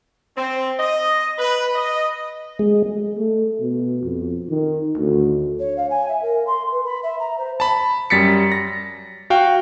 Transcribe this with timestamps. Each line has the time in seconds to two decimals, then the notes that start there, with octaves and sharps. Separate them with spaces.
0.36 C4
0.78 D#5
1.38 B4
1.76 D#5
2.59 G#3
3.17 A3
3.60 B2
4.02 F2
4.49 D#3
4.96 D2
5.59 C#5
5.77 F5
5.90 G#5
6.08 E5
6.22 A#4
6.47 C6
6.71 B4
6.85 B5
7.03 E5
7.20 A#5
7.38 C5
7.60 A5 B5
8.10 F#2 G3 A6 B6 C#7
8.52 A#6
9.30 F#4 F5 G5